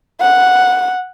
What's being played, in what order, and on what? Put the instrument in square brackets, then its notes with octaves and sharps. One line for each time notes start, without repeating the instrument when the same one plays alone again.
[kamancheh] F#5